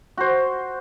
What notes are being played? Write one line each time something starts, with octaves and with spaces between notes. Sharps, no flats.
F#4 C5